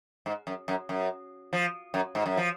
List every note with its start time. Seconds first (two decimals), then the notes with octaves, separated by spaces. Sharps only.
0.26 G#2
0.47 F#2
0.68 F#2
0.89 F#2
1.53 F3
1.94 F#2
2.15 G#2
2.26 F#2
2.37 F3